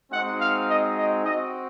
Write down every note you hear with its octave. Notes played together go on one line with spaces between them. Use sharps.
G#3 C4 D#4 F#4 F#5
F5
D#5
D#5
C4 F#4 D#5